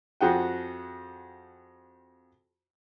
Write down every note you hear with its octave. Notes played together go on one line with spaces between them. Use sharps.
F2 F3 F#4 G#4 F#5 G5